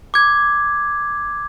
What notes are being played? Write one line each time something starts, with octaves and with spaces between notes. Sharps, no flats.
D6 G#6